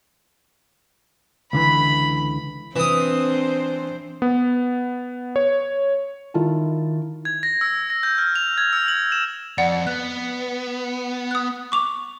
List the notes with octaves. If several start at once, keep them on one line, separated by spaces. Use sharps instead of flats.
C#2 D3 E3 B5
E3 C4 D4 C5 D#6
B3
C#5
D#3 E4 F4 A5
G#6
A#6
E6
A#6
G6
F6
F7
G#6
E6
F#7
E7
F2 D5 F#5
B3 F#6
D#6 F#6
C#6 D6 F7